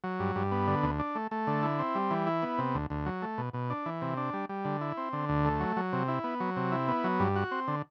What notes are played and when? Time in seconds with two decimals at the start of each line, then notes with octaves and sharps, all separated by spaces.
0.04 F#3
0.20 G2
0.36 G2
0.52 B3
0.67 D3
0.83 D2
0.99 D4
1.15 A3
1.31 A3
1.47 D3
1.63 E4
1.79 C4
1.95 G3
2.11 E3
2.27 E4
2.42 B3
2.58 C3
2.75 D2
2.90 D2
3.06 F#3
3.22 A3
3.38 B2
3.53 B2
3.70 D4
3.86 E3
4.02 C3
4.17 D4
4.33 G3
4.49 G3
4.65 D3
4.81 E4
4.97 C4
5.13 D3
5.29 D2
5.45 A3
5.60 F#3
5.77 F#3
5.93 C3
6.08 E4
6.24 B3
6.40 F#3
6.56 C3
6.72 E4
6.88 B3
7.04 F#3
7.20 G2
7.36 F#4
7.51 C4
7.68 D3